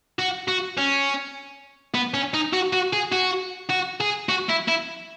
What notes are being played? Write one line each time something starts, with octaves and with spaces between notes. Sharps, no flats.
F#4
F#4
C#4
B3
C#4
D#4
F#4
F#4
G#4
F#4
F#4
G#4
F#4
E4
E4